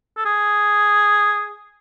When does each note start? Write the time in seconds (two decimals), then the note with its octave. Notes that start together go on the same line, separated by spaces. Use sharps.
0.17 A4
0.25 G#4